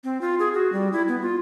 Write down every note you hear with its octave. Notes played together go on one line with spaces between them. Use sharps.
C4
F4
G#4
F#4
G3
E4
B3
F4